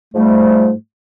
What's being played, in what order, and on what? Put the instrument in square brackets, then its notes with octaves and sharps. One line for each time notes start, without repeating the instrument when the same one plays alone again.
[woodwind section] G#2 F3 G3 A3